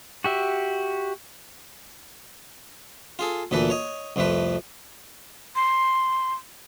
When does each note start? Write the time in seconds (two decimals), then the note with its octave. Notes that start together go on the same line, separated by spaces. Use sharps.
0.24 F#4 G4 E5
3.19 F4 G#4 A4
3.51 D2 A#2 E3 A4 B4
3.70 C#5 D#5
4.16 C2 F2 F3 A3 B4
5.56 C6